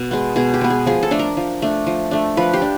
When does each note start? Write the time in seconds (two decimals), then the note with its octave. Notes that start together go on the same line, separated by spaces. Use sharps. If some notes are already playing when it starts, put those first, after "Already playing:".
Already playing: B2
0.11 G#3 B3
0.36 B2 G#4
0.54 G4
0.61 G#3 B3
0.70 G#4
0.86 F3 G#4
1.03 A4
1.11 A3 D4
1.19 A#4
1.37 F3
1.62 A3 D4
1.87 F3
2.11 A3 D4
2.37 F3 B4
2.54 G4
2.62 D4